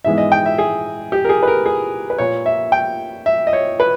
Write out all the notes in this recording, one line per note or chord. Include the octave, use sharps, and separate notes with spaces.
G#2 E3 G#3 B3 E5
D#5
G5
E5
G#4
G4
A#4
G#4
B4
A#4
G#4
B4
A#2 A#3 C#5
E5
G5
E5
D#5
C#5
B4